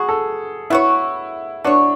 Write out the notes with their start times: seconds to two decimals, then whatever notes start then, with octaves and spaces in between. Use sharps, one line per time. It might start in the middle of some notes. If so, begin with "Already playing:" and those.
Already playing: F#3 B3 F#4 G#4
0.09 A4
0.70 B3 E4 F#4 C#5
1.64 B3 D4 F#4 C#5